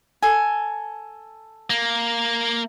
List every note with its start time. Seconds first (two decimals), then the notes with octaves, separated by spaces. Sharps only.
0.22 A4 G#5
1.70 A#3